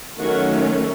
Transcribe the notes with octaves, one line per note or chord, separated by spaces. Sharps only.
D#3 F#3 A3 C#4 F#4